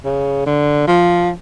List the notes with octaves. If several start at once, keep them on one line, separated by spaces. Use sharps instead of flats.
C#3
D3
F3